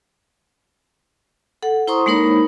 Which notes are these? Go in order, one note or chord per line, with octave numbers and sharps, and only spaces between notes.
A4 F#5
E4 C5 A#5 C6 C#6 D#6
G#3 A#3 D#4 A#4 C#5 B5